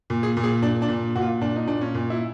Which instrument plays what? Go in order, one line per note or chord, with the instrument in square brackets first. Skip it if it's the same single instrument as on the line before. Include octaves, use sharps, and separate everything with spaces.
[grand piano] A#2
G#4
A#2
G#4
A#2 D4
D4
A#2
A#2 F#4
F4
A#2 D4
D#4
A#2 D4
C#4
A#2
E4